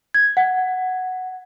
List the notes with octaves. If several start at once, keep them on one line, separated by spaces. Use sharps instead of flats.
G#6
F#5